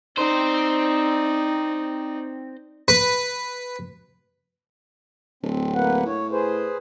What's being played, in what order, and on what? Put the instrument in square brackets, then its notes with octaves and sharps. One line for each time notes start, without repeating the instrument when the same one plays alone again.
[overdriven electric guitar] C4 C5 [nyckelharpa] D#4 D5
[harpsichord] B4
[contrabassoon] D1 [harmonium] C4
[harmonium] A#3 B4 F#5
[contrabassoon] A2 [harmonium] C#5
[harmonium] G#4 B4 C5